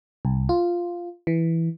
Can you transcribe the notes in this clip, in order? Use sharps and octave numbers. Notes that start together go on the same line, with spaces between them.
C2
F4
E3